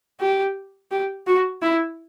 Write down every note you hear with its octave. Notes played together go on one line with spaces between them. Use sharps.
G4
G4
F#4
E4